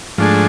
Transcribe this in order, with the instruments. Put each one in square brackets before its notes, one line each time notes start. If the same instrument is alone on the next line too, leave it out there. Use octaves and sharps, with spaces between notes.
[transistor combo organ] G#2 F3 A3 D4 G#4